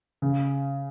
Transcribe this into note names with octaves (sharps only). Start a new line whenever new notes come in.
C#3